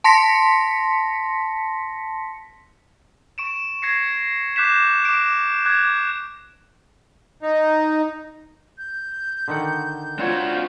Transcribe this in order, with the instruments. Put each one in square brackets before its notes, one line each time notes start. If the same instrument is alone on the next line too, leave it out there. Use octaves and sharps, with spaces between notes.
[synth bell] A5 C6 A#6 B6 C#7
[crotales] C#6 D7 E7
G#6 A#6 C7 C#7
D6 F#6 G6 B6 E7
D6 D7
D6 F#6 G#6
[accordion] D#4
[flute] G6
[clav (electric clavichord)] D3 D#3 F#5
[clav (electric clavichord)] C4 C#5 [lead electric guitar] D4 F#4 [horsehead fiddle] F4